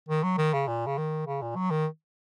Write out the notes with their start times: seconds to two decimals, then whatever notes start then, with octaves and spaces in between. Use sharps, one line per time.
0.09 D#3
0.23 F#3
0.38 D#3
0.54 C#3
0.68 A#2
0.86 C#3
0.98 D#3
1.27 C#3
1.42 A#2
1.56 F#3
1.71 D#3